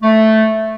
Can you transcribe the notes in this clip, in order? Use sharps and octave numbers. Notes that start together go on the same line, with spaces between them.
A3